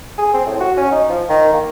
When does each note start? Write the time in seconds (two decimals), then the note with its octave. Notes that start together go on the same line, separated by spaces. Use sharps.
0.18 G#4
0.33 C4
0.46 A2
0.60 F#4
0.77 C#4
0.92 D#4
1.09 F3
1.29 D#3
1.53 A#3